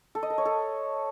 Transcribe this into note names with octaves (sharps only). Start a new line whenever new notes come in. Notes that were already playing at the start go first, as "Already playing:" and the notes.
A4
D#5
A#4
C#5
A4